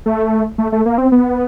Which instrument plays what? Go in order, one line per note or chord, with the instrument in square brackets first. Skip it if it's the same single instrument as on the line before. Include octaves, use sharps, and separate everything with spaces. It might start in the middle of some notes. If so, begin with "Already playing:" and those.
[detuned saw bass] A3
A3
A3
A#3
C4
B3